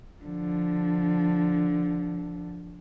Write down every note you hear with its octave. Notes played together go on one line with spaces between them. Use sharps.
D3 F3